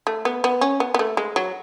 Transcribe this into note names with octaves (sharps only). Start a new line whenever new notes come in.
A3
B3
B3
C#4
B3
B3
A3
G#3
F#3